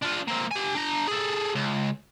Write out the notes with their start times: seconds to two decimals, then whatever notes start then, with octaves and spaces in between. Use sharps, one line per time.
0.02 D4 F4
0.28 A#3 C4
0.51 G4 G#5
0.75 D4 A#5
1.08 G#4 A4
1.55 C#2